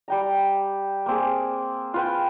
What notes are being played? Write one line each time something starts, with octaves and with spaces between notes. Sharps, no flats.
G3 G5 A#5
A#3 C4 G#4
F4 B4 G5